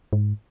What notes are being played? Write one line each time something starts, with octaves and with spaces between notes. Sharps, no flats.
G#2